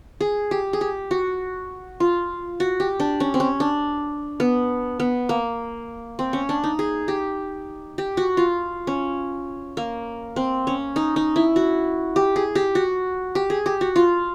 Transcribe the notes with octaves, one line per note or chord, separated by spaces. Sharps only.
G#4
G4
G#4
G4
F#4
F4
F#4
G4
D4
C#4
C4
C#4
D4
B3
B3
A#3
C4
C#4
D4
D#4
G#4
G4
G4
F#4
F4
C#4
A#3
C4
C#4
D#4
D#4
E4
F#4
G4
G#4
G4
F#4
G4
G#4
G4
F#4
F4